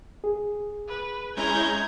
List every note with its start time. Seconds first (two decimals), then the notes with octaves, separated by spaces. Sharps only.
0.24 G#4
0.88 B4
1.37 G#3 C#4 E4 A#5 G6 G#6